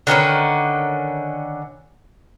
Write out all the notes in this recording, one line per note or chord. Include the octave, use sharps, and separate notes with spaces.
D3 D#3 C#4 B4